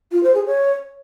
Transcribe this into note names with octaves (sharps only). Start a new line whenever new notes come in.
F4
C5
G#4
C#5